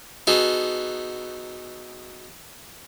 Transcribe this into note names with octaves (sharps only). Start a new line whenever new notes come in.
B3 D#4 F#4 G#4 A4